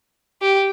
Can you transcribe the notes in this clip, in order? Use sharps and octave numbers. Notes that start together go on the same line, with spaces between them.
G4